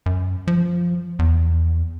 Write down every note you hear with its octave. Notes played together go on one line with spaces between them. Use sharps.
F#2
F3
E2